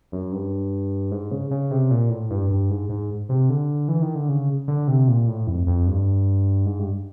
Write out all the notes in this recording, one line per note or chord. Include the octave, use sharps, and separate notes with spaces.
F#2
G2
G#2
C#3
C#3
C3
A#2
A2
G2
G2
G#2
G#2
C3
D3
E3
D#3
D3
C#3
D3
C3
A#2
A2
F2
F2
G2
G#2
G2